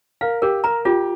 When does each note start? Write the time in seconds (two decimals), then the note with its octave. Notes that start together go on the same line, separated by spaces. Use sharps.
0.21 A#4 F5
0.42 G4 A#4
0.64 A#4 A#5
0.85 F4 G4